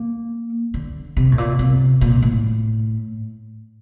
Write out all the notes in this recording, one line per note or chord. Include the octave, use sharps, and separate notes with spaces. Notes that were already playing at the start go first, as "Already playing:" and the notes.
Already playing: A#3
D3
C3
A2
A#2
C3
A#2
A2